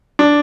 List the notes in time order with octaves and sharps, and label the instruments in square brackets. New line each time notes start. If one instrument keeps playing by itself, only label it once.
[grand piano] D4